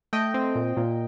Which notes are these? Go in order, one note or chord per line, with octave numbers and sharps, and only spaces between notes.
A3 D#5 G5
C4
A#2
A#2